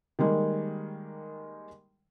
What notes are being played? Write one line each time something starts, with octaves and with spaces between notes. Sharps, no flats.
D#3 G3 G#3 A#3